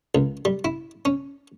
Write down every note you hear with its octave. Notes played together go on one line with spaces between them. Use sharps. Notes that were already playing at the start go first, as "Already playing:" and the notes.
C#2
G3
E4
C#4